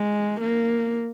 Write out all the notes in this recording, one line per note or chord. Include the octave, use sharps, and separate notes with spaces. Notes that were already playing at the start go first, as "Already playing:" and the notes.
Already playing: G#3
A#3